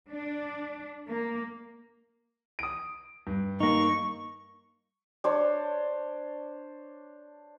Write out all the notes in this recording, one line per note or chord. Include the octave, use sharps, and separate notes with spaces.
D4
A#3
D#6 D7
G2
A#3 D#4 C#6
D4 C5 C#5